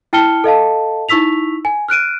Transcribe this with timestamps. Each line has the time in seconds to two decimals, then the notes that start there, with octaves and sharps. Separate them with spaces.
0.13 E4 G5 A5 F6 C#7 G7
0.44 A4 D#5 F5 A5
1.09 D#4 E4 C#6 E6 B6 F7
1.65 G#5
1.88 F6 F#6 D7 D#7